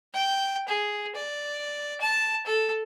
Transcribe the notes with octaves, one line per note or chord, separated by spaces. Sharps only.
G5
G#4
D5
A5
A4